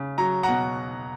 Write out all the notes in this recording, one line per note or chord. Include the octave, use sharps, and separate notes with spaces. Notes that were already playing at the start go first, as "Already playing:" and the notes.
Already playing: C#3
F#3 A#5
F#5 A#5
B2